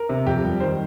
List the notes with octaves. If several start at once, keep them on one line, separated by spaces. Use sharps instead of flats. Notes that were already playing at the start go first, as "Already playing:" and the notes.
Already playing: A#4
C3
F2 G4
G3
D#3 C5